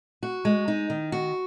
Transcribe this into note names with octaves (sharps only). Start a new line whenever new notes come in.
F#4
G#3
D#4
D#3
F#4